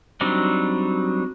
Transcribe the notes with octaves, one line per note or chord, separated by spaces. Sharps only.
F#3 G3 C4 D4 D#4